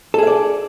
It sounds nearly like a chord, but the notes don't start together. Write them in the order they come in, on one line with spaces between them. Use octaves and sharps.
A4 G#4 E5 D5